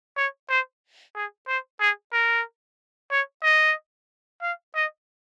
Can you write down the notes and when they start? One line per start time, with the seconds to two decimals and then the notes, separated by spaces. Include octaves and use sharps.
0.17 C#5
0.49 C5
1.15 G#4
1.48 C5
1.80 G#4
2.13 A#4
3.11 C#5
3.43 D#5
4.42 F5
4.75 D#5